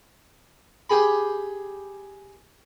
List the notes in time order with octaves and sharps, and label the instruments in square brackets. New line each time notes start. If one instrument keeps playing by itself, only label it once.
[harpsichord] G4 G#4 B5